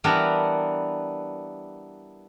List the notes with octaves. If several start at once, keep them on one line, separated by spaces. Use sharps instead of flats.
E3 G3 B3 D4 A#4